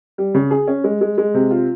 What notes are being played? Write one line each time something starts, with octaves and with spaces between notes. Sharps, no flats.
G3
C#3
G#4
C#4
G#3
G#3
G#3
C3
F4